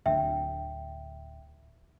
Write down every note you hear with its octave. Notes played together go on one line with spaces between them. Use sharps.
D1 D2 D3 E5 G5